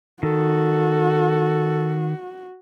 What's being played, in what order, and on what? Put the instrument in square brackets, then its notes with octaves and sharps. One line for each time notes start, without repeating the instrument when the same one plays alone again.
[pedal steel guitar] D#3 [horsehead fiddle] F#4 [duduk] A4